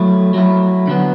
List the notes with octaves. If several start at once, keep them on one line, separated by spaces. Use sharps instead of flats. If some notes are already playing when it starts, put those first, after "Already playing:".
Already playing: F#3 A3 E4
F#3 A3 E4
D3 F#3 B3